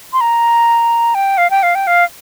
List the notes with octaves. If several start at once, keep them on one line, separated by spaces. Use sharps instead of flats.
C6
A#5
G5
F5
G5
F5
G5
F5